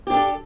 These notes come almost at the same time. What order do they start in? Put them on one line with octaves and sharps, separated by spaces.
G4 D4 A4